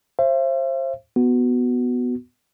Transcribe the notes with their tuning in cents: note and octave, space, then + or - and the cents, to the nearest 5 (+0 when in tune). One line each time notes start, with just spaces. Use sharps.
C5 +25 E5 +45
B3 +0 F#4 +0